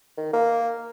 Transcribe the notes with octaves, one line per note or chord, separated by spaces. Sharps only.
D#3
A#3